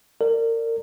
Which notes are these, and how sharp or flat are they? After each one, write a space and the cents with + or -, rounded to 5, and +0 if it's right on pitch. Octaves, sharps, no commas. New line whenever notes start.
A#4 -30 D5 +0